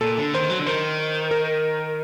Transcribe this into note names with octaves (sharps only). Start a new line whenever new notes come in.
A#2 A4
D3
D#3 C5
F#3
D3
D#3 C5
A#4